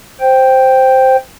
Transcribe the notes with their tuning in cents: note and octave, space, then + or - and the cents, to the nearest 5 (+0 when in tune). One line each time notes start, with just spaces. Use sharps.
C5 +0 G5 +0